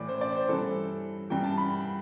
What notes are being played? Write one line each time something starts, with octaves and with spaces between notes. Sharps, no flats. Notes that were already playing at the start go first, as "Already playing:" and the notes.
Already playing: A2 E3 D5
C5
D5
C5
G2 E3 A4
G2 E3 G5
A5
B5